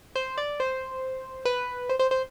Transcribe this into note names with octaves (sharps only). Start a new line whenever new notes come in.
C5
D5
C5
B4
C5
C5
C5